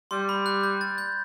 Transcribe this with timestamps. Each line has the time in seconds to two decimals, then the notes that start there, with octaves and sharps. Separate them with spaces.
0.11 G3 C6
0.29 B5
0.46 F#6
0.63 G6
0.81 A6
0.98 G6